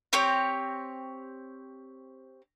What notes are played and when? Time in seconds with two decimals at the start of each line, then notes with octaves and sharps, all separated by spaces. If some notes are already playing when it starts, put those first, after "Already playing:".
0.13 C4 G4 C#5